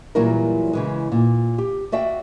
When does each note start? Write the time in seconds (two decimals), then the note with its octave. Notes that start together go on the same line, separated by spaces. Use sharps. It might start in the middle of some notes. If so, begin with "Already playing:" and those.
0.15 A#2 E3 F#3 G3 E4 A#4
0.73 C#3 E3 G#3
1.12 A#2
1.58 G4
1.92 F#4 D5 E5 F5 G5